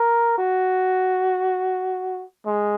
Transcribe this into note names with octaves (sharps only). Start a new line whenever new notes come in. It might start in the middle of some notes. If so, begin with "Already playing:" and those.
Already playing: A#4
F#4
G#3